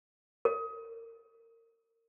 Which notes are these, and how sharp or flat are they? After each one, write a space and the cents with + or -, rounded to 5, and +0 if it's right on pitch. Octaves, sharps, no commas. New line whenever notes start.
A#4 -35